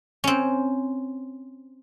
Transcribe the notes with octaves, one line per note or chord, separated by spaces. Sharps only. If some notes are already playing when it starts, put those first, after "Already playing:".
C4 C#4